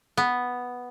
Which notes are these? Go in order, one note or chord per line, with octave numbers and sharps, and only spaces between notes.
B3